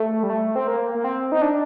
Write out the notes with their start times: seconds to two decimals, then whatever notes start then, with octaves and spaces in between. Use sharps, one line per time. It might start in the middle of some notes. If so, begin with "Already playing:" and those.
Already playing: A3
0.23 G3
0.30 A3
0.56 C4
0.68 A#3
0.95 A#3
1.04 C4
1.32 D#4
1.42 D4